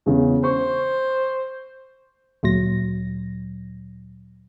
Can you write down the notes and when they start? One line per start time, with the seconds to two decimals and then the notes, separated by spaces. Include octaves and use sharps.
0.06 E2 C#3
0.43 C5 C#6
2.43 D2 A#2 F#3 A#6